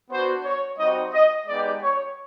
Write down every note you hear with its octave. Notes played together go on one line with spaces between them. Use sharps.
B3 D4 F#4 C5
C#5
G3 C4 D#4 F#4 D#5
D#5
G#3 B3 D#4 G4 D5
C#5